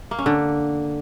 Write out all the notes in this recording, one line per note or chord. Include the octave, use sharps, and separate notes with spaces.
A#3
C#4
D3